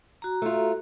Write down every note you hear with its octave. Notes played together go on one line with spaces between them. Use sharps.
F#4 A#5
A3 F4